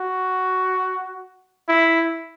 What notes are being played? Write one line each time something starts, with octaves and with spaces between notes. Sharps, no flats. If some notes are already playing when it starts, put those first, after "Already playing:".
Already playing: F#4
E4